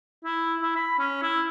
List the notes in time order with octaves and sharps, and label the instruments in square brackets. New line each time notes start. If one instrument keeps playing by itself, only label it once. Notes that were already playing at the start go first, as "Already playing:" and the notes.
[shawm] E4
E4
B5
C#4
E4